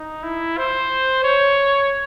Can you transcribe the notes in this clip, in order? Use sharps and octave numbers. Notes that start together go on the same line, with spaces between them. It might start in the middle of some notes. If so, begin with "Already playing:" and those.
Already playing: D#4
E4
C5
C#5